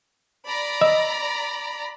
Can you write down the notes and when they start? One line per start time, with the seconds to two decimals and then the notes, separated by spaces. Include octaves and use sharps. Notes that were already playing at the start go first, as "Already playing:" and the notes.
0.47 D5 A#5 B5
0.81 D#5 E6